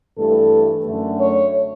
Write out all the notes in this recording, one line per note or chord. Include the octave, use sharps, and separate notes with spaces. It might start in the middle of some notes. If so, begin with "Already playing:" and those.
G2 E3 A3 A4
F#2 D3 A3
C#5